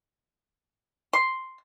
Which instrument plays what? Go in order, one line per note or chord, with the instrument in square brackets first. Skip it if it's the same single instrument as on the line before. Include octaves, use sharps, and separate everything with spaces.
[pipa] C6